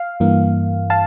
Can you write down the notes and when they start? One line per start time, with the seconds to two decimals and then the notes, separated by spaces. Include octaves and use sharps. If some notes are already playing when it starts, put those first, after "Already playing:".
Already playing: F5
0.20 G2 E3 A#3
0.90 F5 A5